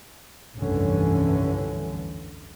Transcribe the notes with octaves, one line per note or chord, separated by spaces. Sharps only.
F1 C2 G2 D3 E3 C#4